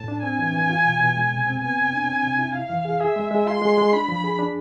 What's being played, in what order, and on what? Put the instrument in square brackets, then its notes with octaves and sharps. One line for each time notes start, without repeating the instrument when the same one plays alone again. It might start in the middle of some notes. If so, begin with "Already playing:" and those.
Already playing: [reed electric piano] A2 [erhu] A5
[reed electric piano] D4
[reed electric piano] C4 [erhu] G#5
[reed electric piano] E3
E3
F4
B2
B2
G#3
C3
C4
[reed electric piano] B3 [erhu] G#5
[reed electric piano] C3
D4
C4
C3
E4
[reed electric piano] E4 [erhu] F5
[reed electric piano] E3
G#4
[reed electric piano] G#4 [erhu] E5
[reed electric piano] G#3
G#3
[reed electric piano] F4 [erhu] C6
[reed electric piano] G#3
G#3
[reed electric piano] D4 [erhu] B5
[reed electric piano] F3
G#4
D4